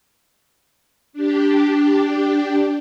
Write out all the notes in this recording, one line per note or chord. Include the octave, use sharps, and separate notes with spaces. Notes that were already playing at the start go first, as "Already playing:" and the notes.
D4 G4